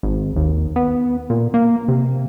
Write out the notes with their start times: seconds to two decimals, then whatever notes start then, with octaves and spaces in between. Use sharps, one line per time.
0.03 G#1
0.36 D#2
0.76 B3
1.30 A#2
1.54 A#3
1.88 C3